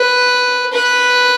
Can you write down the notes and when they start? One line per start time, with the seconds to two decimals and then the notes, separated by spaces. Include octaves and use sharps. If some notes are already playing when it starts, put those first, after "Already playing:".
Already playing: B4
0.73 B4